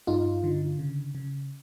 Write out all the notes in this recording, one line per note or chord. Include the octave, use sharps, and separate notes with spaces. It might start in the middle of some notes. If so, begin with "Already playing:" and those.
G2 D#4 F4
D3
C#3
C#3